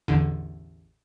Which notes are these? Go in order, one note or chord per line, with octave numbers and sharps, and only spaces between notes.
A1 E2 D3